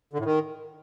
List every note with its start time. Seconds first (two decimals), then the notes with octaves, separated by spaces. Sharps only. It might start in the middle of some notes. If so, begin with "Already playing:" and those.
0.13 D3
0.19 A2
0.25 D#3